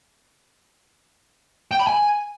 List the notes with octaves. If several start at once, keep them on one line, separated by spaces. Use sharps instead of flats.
G5
B5
G#5